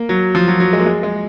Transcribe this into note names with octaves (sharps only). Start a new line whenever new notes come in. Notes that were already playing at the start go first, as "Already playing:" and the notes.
Already playing: A#3
F#3
F3
F#3
F#3
G#3
A#3
G#3
G#3